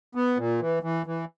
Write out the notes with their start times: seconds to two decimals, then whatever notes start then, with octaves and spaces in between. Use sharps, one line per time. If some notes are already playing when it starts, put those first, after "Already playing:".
0.15 B3
0.38 A#2
0.61 E3
0.83 E3
1.06 E3